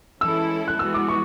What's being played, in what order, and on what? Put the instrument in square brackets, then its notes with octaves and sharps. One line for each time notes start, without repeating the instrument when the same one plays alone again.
[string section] E3 G#3 C#4 E4 A4 [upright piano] E6
[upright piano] F#6
[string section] E3 G#3 B3 F#4 [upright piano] E6
[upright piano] D6
C#6